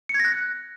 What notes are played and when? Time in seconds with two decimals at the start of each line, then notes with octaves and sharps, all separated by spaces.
0.09 C#7
0.14 G#6
0.20 A#6
0.25 F#6